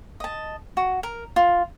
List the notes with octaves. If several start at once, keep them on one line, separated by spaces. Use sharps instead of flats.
D#5 A5
F#4
A#4
F4